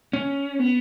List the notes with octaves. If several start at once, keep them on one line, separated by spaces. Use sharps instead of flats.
C#4
B3